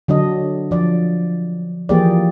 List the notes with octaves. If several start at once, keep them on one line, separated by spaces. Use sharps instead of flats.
D3 F#3 D4 D#5
F3 D5
E3 F3 A#3 G4 G#4 D5